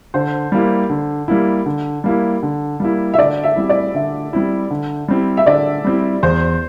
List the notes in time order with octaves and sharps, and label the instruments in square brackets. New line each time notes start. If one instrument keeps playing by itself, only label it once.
[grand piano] D3 [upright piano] C5
[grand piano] G3 A#3 E4
D3
G3 A#3 E4
D3
G3 A#3 E4
D3
G3 A#3 E4
[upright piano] E5
[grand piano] D3 [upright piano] D5
[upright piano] E5
[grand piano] G3 C4 E4
[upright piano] D5
[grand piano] D3 [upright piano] E5
[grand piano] G3 C4 E4
D3
G3 C4 E4
[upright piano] E5
[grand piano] D3 [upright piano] D5
[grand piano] G3 C4 E4
[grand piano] E2 [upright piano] C5